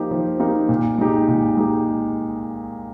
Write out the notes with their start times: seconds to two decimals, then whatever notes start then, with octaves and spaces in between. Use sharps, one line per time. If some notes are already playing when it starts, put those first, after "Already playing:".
Already playing: F3 A#3 D#4 G4
0.11 F3
0.40 A#3 D#4 G4
0.69 A#2
0.98 G#3 D#4 G4
1.28 A#2
1.57 G#3 D#4 G4